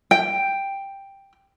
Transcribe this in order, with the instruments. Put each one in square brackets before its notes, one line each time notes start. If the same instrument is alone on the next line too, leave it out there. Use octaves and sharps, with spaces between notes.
[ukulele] G5